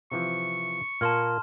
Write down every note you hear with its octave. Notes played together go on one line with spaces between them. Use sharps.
C3 E3 F3 C#6
A#2 A#3 A5 C6 F6